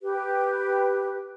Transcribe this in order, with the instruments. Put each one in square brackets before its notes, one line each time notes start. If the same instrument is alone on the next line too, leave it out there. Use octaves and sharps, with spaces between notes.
[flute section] G4 B4